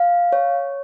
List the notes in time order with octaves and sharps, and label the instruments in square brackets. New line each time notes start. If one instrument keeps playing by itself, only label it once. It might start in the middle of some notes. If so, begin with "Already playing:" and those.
Already playing: [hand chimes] F5
C#5